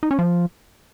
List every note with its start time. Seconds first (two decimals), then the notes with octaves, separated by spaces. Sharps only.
0.03 D#4
0.11 C#4
0.19 F3